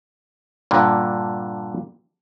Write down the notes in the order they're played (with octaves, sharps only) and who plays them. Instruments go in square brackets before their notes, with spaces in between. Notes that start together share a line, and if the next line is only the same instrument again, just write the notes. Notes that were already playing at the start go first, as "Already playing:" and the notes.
[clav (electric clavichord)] G2 A#2 D3